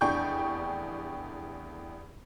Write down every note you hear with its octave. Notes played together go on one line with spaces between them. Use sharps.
F1 E2 D4 G5 C#6 G6